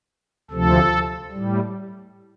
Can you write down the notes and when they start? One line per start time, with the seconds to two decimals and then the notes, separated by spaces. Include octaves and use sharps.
0.51 D2 C3 F3 A4
1.31 A2 G3